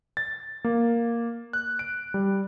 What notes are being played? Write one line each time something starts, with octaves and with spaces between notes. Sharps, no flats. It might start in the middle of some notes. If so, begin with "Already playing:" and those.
A6
A#3
F#6
D7
G3